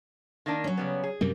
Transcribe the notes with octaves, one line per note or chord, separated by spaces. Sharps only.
D#3 A#3 D4
F#3 C#4
C#3 G3 B3
G#4
F#2 C3 G3 A#3